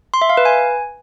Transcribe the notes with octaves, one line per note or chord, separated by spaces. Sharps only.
C6
E5
F5
B4
G#5